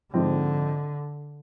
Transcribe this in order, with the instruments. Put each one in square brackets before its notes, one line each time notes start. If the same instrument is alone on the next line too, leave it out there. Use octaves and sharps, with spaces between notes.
[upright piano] G#2 F3 C4 [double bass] D3